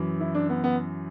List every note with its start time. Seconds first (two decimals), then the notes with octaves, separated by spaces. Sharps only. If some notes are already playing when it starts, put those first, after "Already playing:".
Already playing: F#2 E3
0.21 E4
0.35 D4
0.50 B3
0.64 B3